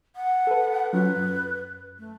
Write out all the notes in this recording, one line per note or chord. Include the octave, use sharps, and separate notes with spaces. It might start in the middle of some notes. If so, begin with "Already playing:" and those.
F#5
A4 B4
F#3 C#4 F4 B4
F#2
A3